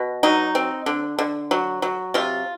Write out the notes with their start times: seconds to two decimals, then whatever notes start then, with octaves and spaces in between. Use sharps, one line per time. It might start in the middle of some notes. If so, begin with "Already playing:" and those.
Already playing: B2
0.23 F#3 D#4
0.55 C4
0.86 D3
1.19 D3
1.51 F#3
1.82 F#3
2.14 C3 F4